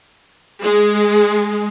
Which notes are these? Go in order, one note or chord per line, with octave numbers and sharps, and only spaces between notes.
G#3